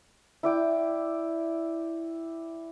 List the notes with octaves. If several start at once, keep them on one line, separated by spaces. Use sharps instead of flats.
E4 D5 G5